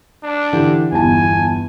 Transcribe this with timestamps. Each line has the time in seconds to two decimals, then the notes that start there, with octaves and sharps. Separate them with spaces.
0.24 D4
0.53 D3 E3 G4
0.92 G1 E2 G#5 A5